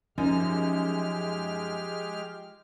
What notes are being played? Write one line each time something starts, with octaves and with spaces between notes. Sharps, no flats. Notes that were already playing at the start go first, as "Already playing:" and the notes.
F#2 F3 G#3 D#4 G4 F6